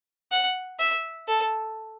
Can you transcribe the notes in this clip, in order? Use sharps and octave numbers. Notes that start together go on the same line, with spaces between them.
F#5
E5
A4